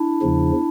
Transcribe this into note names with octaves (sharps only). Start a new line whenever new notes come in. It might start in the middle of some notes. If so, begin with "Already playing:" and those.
Already playing: D4 E4
E2 C#3 F3